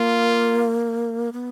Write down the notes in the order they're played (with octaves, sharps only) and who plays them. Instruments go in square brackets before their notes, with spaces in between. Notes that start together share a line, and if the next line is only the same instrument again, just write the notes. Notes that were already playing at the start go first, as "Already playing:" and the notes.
Already playing: [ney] A#3 [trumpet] F4
[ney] B3